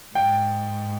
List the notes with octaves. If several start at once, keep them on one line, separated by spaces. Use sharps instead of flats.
G#2 G5